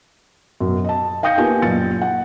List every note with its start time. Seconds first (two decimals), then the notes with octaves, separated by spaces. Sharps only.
0.60 F#2 B2
0.85 D#5 A5
1.23 F5 G5 D#6 G6 A#6 C#7
1.38 A#3 B3 F4 G4 G#5
1.62 F#1 A#2 A6 C#7
2.02 F#5